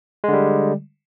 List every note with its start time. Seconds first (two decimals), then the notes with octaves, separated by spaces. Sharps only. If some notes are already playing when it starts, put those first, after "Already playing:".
0.24 G#3
0.28 D3
0.33 G3